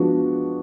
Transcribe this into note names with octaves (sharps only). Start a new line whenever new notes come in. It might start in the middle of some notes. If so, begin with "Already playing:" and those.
Already playing: F3 G#3 B3 D4 F#4